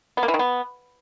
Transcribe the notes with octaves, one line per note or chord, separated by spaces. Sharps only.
B3
A#3
E3
D#3
B3